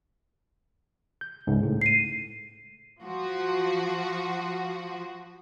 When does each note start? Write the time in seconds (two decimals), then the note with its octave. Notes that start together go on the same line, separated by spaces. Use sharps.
1.21 G6
1.47 C#2 G#2
1.63 A2
1.81 C7 D#7
3.03 F3 F#4